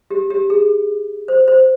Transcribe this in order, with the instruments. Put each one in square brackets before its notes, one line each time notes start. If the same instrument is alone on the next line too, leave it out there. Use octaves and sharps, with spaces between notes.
[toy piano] G4
G4
G#4
C5
C5